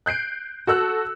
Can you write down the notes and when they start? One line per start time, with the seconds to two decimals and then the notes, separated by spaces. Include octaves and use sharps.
0.06 F#6 G6 C7 D7
0.67 F#4 A4 E6 F#6